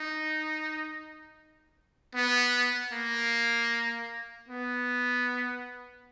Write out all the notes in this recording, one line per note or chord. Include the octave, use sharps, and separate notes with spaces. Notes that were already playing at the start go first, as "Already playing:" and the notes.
Already playing: D#4
B3
A#3
B3